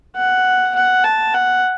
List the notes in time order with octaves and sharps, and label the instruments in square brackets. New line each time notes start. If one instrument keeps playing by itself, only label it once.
[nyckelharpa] F#5
F#5
A5
F#5